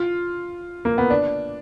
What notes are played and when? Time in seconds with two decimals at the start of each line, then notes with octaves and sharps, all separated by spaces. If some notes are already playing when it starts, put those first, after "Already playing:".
Already playing: F4
0.85 A#3
0.98 B3
1.10 D4